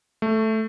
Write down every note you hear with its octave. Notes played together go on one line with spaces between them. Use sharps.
A3